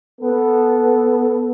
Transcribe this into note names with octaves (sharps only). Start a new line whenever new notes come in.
B3 A4